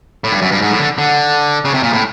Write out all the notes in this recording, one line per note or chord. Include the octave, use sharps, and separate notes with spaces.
A2
G2
F#2
G2
G#2
A2
D3
D3
C#3
C3
A#2
A2